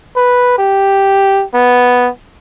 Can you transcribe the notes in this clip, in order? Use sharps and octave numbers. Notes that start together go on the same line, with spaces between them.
B4
G4
B3